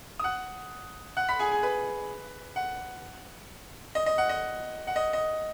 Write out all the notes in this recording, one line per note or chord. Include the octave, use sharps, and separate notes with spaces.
D#6
F#5 F#6
F#5 F#6
B5 B6
G#4 G#5
G#4 G#5
B4 B5
F#5
D#5
D#5
F#5
D#5
F#5
D#5
D#5